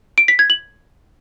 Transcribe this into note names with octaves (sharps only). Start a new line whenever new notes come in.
D7
B6
G#6
F#7